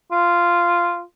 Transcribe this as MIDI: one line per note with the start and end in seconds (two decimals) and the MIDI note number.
0.12 1.02 65